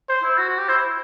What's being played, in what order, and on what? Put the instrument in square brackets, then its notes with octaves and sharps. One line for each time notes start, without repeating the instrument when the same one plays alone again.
[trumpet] C5
[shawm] E4
F#4
F#4
G4
[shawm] E4 [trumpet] C5